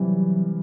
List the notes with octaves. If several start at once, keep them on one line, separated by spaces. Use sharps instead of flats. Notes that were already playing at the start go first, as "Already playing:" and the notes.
Already playing: C3 E3 F#3 G3